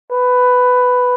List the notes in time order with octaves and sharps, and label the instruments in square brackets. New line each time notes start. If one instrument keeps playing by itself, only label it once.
[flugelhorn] B4